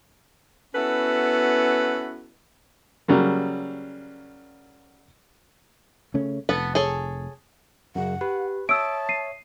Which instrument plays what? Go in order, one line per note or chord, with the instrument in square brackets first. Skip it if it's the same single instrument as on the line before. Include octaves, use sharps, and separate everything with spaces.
[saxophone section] B3 C#4 E4 F#4 A4 B4
[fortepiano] C#3 F#3 G3 A#3
[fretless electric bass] C#3 A3 C#4
[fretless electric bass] F1 [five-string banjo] B3 A4 B4
[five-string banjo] G#4 A4 C#5
[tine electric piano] F#2 C#3 [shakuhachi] F#5
[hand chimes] G4 [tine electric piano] B4
[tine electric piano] C#5 E5 [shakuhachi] A5 [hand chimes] D#6 [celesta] E6 D7
[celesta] C7 D#7